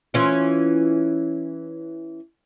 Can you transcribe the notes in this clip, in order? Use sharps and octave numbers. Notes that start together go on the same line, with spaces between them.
E3 C#4 F4